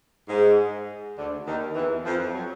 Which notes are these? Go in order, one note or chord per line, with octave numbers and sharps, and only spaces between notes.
G#2
D2 D3
D#2 D#3
E2 E3
F2 F3
F#3